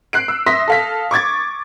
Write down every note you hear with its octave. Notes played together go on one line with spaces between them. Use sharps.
F#6 C7 D7
E6
E5 C6 D#6 A#6 B6
A4 F5 B6
C#6 D6 G#6 A6